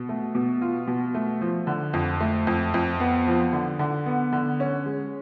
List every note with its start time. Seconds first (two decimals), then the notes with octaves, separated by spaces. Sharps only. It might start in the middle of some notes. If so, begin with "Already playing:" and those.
Already playing: B2
0.09 A3
0.35 B2
0.62 F4
0.87 B2
1.14 A3
1.41 F3
1.67 D3
1.93 F2
2.20 A3
2.47 F2
2.74 F2
3.00 B3
3.27 F3
3.53 D3
3.79 D3
4.06 B3
4.33 D3
4.60 C#4
4.86 G#3